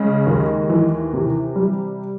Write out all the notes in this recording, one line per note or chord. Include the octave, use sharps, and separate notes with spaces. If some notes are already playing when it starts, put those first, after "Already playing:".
Already playing: C#3 G#3
D#2
E3
C3
G3